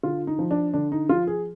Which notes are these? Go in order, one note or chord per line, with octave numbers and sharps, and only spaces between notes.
D3 F4
D#4
F3
D4
D3 D4
D#4
F3 F4
G#4